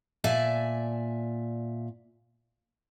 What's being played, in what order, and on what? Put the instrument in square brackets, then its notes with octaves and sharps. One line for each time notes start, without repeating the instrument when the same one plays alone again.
[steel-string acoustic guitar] A#2 D5 E5 G#5 A5